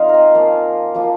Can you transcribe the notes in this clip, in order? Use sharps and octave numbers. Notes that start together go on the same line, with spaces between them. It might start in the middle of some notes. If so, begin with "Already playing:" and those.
Already playing: F3 C4 D#4 A#4 C5 D#5 F5
G#5 A#5
F3 A#3 F4
F3 A#3 F4